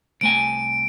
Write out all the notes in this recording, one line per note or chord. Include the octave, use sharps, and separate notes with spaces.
C2 A3 G#5 D7